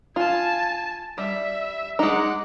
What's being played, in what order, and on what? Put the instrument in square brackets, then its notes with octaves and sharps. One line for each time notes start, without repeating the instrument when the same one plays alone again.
[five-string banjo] F4 [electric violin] G#5 A5
[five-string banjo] G3 [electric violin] E5
[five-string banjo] G#3 D#4 [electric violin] F#5 D6